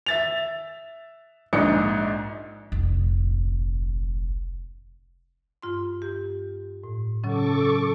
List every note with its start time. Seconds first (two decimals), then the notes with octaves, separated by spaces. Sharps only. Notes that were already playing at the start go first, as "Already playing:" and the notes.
0.06 E5 A6 F7
1.53 A#1 G#2 D#4 D5 D#5 C#7
2.72 F1 A#1
5.62 G2 F4 C6
6.02 G4
6.84 A2
7.24 C#3 F#3 C#4 A4 C#6 D6